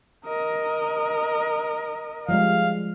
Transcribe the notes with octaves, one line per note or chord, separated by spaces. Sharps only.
A#4 D#5
F3 G3 G#3 F5